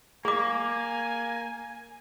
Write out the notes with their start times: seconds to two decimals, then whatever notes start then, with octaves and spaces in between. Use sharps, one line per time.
0.25 A#3 G#4 G#5 D6